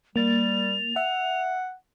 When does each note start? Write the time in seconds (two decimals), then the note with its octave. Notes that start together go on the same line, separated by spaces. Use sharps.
0.16 G3 A#3 A6 F7
0.96 E5 F#5